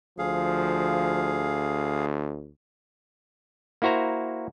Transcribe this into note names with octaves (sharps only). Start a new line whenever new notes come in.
D2 F3 G#4 F5
A#3 E4 F#4 C5 A#5